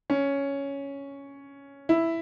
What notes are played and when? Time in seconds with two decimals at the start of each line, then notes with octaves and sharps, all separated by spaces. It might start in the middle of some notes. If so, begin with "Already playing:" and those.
0.10 C#4
1.89 E4